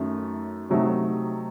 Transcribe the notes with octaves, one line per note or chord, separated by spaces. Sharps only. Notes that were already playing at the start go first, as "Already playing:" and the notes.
Already playing: F#2 D#3 A3 C#4
C3 F#3 A3 D#4